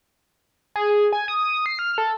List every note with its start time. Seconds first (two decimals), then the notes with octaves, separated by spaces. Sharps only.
0.76 G#4
1.13 G#5
1.28 D#6
1.66 C7
1.79 F6
1.98 A4